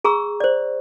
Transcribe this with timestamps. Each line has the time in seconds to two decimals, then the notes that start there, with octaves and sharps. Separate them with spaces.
0.04 G#4 A#5 C#6 E6
0.40 C5 D5